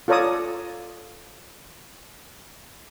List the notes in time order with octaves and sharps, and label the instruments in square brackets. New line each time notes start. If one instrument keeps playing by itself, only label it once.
[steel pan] F4 A4 C#5 D5 A#5 D#6